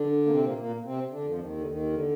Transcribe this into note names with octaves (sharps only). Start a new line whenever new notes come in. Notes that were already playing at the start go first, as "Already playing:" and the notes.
Already playing: D3 D4
A#3
C3 C4
A#2 A#3
A#2 A#3
C3 C4
D3 D4
F2 F3
D#2 D#3
D3
D#2 D#3
D3